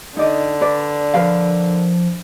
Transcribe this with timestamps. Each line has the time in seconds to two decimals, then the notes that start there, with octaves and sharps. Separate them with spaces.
0.17 D3 D#4 D5 D#5
0.61 B4 D5
1.14 F3 A#4 B4 F5